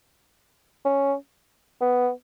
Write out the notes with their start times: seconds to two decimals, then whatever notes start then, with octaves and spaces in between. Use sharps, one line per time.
0.85 C#4
1.81 B3